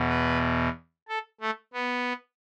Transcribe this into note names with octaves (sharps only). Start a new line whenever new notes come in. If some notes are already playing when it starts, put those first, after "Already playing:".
Already playing: E2 B2
B4
A4
A3
B3